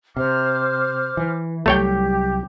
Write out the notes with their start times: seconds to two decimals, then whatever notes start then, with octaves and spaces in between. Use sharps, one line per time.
0.16 C3 C5 D6 F6
1.17 E3
1.66 C2 F#3 G3 A3 G4 C#5 G5